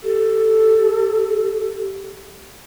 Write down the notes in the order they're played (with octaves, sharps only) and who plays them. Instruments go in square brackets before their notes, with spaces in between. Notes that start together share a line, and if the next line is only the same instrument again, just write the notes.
[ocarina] G4 [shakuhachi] A4